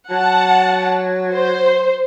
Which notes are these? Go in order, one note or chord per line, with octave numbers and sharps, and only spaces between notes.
F#3 F#5 A5
C5